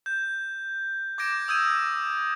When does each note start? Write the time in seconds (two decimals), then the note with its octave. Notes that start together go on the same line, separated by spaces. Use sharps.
0.06 G6
1.18 D6 G6 G#6 A#6 D7
1.48 D#6 E6 G6 G#6 D#7